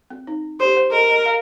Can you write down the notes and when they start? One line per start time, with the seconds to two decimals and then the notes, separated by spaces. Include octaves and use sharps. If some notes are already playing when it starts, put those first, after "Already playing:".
0.10 C4
0.27 D#4
0.60 G4 C5
0.77 C5
0.92 A#4 D#5
1.09 D#5
1.26 F5